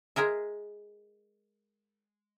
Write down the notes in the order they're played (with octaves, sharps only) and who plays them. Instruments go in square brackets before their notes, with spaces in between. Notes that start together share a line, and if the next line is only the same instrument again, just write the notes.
[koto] G#3 G#4 A#4 E5